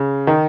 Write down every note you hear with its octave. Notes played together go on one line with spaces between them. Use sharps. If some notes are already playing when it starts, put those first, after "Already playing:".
Already playing: C#3
D#3